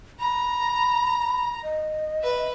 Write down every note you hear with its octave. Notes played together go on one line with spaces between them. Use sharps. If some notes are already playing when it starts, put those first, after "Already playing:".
A#5 B5
D#5
B4 E5